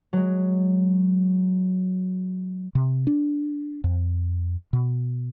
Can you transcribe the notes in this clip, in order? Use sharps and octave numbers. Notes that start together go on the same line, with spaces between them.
F#3 G#3
C3
D4
F2
B2